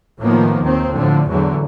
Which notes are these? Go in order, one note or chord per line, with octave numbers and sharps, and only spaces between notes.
A2 D#3 F3 A#3 B3
D#2 D#3 C4
A2 D3 F3
E2 A2 D3 F#3